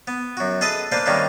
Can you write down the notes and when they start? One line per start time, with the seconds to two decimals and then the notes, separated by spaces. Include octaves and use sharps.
0.07 B3
0.37 F#2 F#4
0.61 G#4 A4 B4 D#5 E5 A5
0.92 A#3 D4 B4 C5
1.06 G2 D#3 A#3 C#4 D4 E5